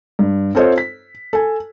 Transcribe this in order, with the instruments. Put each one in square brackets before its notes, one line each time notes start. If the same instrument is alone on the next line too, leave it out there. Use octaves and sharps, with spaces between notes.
[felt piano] G2
C4 F4 A4 C5 C#5 D#5
B6
A4 G#5